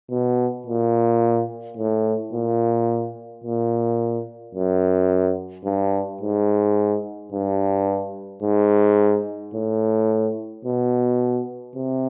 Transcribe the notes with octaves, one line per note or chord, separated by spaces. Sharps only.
B2
A#2
A2
A#2
A#2
F#2
G2
G#2
G2
G#2
A2
B2
C3